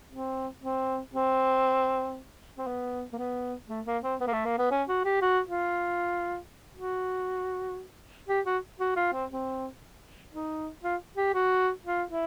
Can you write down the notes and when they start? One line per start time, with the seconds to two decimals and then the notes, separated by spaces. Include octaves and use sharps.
0.12 C4
0.63 C4
1.14 C4
2.58 C4
2.67 B3
3.13 A#3
3.18 B3
3.69 A3
3.86 A#3
4.03 C4
4.20 B3
4.27 A#3
4.33 A3
4.45 A#3
4.59 B3
4.71 C#4
4.89 F#4
5.05 G4
5.22 F#4
5.48 F4
6.75 F#4
8.28 G4
8.46 F#4
8.79 F#4
8.96 F4
9.13 C4
9.31 C4
10.32 D#4
10.84 F4
11.17 G4
11.34 F#4
11.85 F4
12.11 E4